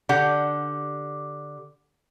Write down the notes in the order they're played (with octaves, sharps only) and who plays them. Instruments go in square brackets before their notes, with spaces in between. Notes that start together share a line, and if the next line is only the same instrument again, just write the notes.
[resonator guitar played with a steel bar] D3 G4 F#5